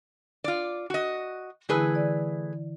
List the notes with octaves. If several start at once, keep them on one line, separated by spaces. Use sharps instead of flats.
F4 D5
F#4 D#5
D3 E3 A3 E4 G#4 B4
E3 D5